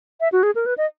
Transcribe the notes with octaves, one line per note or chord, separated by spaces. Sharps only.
E5
F#4
G#4
A#4
B4
D#5